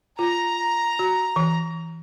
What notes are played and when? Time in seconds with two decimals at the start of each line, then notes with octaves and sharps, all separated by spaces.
0.19 F4 A#5
0.99 F#4
1.36 E3